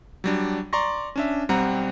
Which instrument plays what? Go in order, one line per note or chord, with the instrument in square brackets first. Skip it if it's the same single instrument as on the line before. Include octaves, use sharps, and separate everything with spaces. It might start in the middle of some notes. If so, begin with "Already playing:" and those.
[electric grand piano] F#3 G3 D4
D5 A#5 C6 C#6 A#6
C#4 D4 E5
B1 G3 C4 F#5 A#5